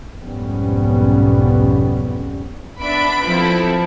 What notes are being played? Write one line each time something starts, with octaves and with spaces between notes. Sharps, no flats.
B1 F2 G#2 G3 B3 C#4
B3 D4 E5 B5 D7
F3 C4 E4 A4